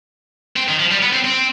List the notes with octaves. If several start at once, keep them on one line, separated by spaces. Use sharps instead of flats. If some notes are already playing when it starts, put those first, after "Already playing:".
C4
D#3
F3
G3
B3
C4
C4